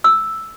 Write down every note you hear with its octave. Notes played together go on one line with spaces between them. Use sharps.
E6